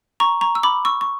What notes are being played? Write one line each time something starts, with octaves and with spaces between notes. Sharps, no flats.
A#5 C#6
A#5 C#6
E6
B5 D6
C#6 E6
C#6